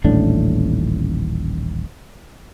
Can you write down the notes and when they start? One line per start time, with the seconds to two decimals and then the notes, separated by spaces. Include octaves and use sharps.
0.04 D#1 A1 A2 D4